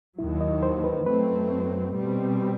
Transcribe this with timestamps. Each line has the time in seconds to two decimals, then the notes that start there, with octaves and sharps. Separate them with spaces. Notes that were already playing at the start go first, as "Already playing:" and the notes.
0.18 D#2 D#3 F#3 E4
0.41 D#5
0.63 C5
0.84 B4
1.06 F#2 F#3 A3 C4 B4
1.94 B2 G3 C4